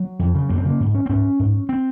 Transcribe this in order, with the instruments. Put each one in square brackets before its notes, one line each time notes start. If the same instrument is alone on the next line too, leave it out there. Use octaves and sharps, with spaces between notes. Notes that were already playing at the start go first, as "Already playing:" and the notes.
Already playing: [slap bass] F#3
F2
C#3
F#2 A#3
C4
C#3 A#3
G#2
C#4
C4
G#2 C#4
G#2
C4